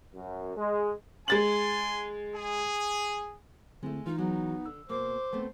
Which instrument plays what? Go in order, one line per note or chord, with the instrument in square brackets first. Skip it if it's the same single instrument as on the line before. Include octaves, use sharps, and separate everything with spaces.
[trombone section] F#2
G#3
[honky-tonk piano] G#3 A6 F#7 [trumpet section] G#5 C6
[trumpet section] G#4
[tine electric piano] D3 C4 E4 [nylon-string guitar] G#3 A3
[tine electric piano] E3 [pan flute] D#4 [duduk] F4
[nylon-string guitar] F#3 G#3 [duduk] B3
[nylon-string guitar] D3 [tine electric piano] E6
[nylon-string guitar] B2 A#3 [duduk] C5 [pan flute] D6
[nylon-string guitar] A3 B3 C4